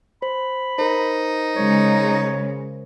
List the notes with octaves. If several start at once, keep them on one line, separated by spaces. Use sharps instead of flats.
C5 B5
D#4 A#4 C5
C#3 G#3 C#5